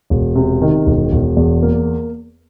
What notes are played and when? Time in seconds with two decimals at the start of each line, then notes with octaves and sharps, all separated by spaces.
0.10 E1
0.35 C3
0.62 D#3
0.86 E1
1.12 E1
1.37 E2
1.63 A#3